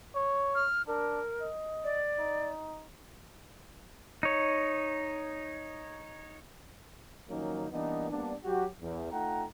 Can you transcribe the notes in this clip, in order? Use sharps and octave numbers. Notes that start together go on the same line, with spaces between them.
C#5
F6
D4 A#4
D#5
D5
D#4
D#4 C#5
D#3 F3 F#3 A#3 C#4 D#4
E3 G3 A#3 B3 D4 D#4
G3 A#3 B3 D4
F#3 F#4 G4
E2
A3 D#4 F4 F#5 G5 A#5